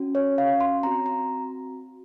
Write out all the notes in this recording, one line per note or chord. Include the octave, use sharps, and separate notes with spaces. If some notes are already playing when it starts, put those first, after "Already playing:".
Already playing: C#4 F#4
C#5
F5
C6
C4 F#4 A#5
A#5